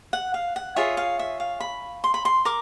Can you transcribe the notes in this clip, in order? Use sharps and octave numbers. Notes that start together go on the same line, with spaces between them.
F#5
F5
F#5
F4 G#4 C#5 E5
F5
E5
F5
B5
C6
B5
C6
A#4 D6